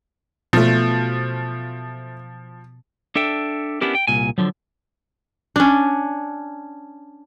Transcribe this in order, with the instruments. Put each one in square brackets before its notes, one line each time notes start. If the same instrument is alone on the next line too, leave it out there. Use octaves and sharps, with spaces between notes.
[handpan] B2 [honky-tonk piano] F3 [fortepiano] A3 F4
[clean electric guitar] D4 A4 E5 G5
B3 C#4 D4 E4 G4 A#4
G5
C2 A#2 G#5
D3 F3 F#3
[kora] C#4 D4